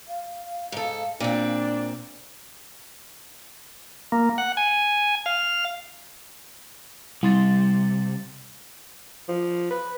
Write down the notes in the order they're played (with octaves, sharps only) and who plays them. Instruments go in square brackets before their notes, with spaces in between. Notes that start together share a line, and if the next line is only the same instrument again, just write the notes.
[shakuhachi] F5
[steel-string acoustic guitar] G#2 A4
[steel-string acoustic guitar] A#2 C4 [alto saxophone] D4
[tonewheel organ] A#3
F#5
G#5
F5
[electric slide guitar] C3 [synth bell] G3 C6 A6
[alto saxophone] F3
B4